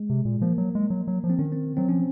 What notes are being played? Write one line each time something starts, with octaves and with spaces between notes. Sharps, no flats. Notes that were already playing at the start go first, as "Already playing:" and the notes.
Already playing: G#3
C3
A#2
F3 A#3
F#3
G#3
F#3
F#3
F3
C4
D#3 C#4
C4
F#3 C4
F3 C#4